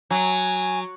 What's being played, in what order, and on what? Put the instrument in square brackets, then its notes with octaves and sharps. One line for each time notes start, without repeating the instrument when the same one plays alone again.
[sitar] F#3 [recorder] G#5